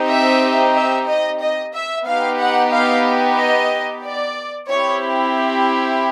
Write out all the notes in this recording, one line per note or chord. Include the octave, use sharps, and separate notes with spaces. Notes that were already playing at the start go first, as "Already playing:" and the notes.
Already playing: C4 D#4 G4
E5
E5
D#5
D#5
E5
B3 D#4 G4 F5
F#5
F5
D#5
D5
C4 E4 G4 C#5